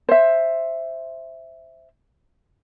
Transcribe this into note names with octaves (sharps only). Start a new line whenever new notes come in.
C5 E5